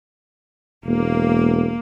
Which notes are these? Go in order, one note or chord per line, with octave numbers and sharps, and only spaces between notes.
E1 A#3